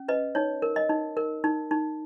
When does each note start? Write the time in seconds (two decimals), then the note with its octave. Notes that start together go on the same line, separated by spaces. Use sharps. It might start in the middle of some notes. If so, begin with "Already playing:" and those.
Already playing: C#4
0.08 B4 D#5
0.35 D#4 C#5
0.62 A#4
0.76 D#5
0.89 D#4
1.17 A#4
1.44 D#4
1.71 D#4